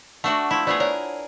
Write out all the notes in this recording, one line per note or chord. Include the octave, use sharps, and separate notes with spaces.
A3 D4 F#4 E5 F#5
F3 E4 B5
A3 B3 F4 G#4 C5 D5
A#4 C#5 D5 F#5